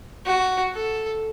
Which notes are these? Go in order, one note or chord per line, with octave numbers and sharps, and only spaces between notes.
F#4
A4